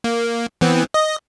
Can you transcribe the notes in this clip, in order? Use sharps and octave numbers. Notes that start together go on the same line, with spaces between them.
A#3
E3 B3 C4
D#5